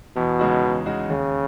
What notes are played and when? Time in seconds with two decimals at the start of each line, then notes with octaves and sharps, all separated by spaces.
0.16 E2 B2
0.39 C#3 G#3 D#4 F#4
0.63 E2
0.86 C#3 G#3 D#4 F#4
1.09 D#2 C#3